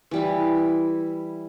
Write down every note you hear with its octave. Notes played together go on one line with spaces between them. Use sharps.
E3 G3 E4